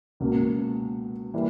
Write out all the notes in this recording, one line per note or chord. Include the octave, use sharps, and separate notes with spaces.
C#2 B2 A#3
E3 G3 A#3